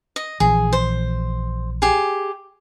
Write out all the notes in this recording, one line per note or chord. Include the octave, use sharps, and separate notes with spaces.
D#5
A#1 E3 G#4
C5
G4 G#4